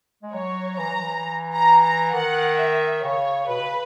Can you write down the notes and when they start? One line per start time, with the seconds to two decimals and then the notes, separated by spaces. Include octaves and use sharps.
0.23 G#3
0.33 F#3 C#5
0.78 E3 A#5
0.90 F#3
1.02 E3
1.54 A#5
1.84 A#5
2.13 D#3 F#5
2.58 E5
3.03 C#3 C#5
3.48 B2 B4
3.60 C#3